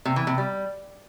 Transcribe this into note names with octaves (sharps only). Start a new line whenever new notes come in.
C3
E3
C3
G3